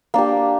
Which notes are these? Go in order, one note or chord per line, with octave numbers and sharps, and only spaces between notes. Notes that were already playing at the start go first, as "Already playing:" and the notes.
A#3 D4 G4